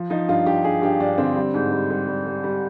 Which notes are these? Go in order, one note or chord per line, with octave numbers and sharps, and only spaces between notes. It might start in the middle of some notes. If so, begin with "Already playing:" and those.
Already playing: F3
F3 D#4
G2 F4
G2 G4
G2 G#4
G2 G4
G2 D4
D3 C4
G3
G#2
G3
G3
G3
G3
G3